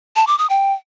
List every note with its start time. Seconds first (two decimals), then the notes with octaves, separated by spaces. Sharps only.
0.16 A5
0.27 D6
0.38 D#6
0.50 G5